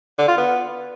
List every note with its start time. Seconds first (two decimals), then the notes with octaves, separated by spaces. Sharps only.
0.18 D3
0.28 F4
0.38 B3